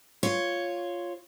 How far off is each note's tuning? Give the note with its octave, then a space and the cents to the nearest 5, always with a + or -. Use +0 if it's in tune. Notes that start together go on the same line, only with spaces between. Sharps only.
F4 +0 C#5 +0